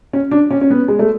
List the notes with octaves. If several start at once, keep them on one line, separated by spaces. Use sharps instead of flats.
C#4
D4
C#4
C#4
B3
G#3
A3